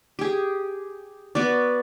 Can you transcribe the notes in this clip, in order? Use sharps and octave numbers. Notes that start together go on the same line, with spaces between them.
G4 G#4
B3 F#4 D5